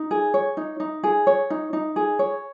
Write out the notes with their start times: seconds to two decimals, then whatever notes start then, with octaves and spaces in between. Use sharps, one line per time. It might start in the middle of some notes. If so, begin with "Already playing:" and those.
Already playing: D#4
0.11 G#4
0.34 C#5
0.57 D#4
0.80 D#4
1.03 G#4
1.27 C#5
1.50 D#4
1.73 D#4
1.96 G#4
2.19 C#5